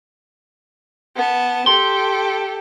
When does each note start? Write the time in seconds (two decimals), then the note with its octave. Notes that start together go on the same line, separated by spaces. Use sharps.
1.16 B3 A5
1.67 G4 A4 C6